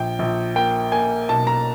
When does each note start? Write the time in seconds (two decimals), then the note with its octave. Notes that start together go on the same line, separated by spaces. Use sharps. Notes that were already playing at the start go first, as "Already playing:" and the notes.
Already playing: A#1 G5
0.19 A#1
0.56 A#3 G5
0.92 A#3 G#5
1.29 B1 A5
1.47 A#5